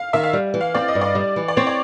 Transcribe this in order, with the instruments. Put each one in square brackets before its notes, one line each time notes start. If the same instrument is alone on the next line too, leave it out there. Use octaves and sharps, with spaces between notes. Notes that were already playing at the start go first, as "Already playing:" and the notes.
Already playing: [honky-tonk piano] F5
[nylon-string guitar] D#3 [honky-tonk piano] E5
[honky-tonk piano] F5
[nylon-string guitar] G3
E3
[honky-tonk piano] F5
[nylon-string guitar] C4 [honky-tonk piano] D5
[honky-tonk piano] D#5
[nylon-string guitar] G2
[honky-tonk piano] D5
[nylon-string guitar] G3
E3
[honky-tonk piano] D5
[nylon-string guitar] C4 [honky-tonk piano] C#5
[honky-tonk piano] D5